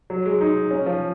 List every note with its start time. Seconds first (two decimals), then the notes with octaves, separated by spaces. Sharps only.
0.10 F#3
0.25 G#3
0.41 D#4
0.71 C#4
0.86 F3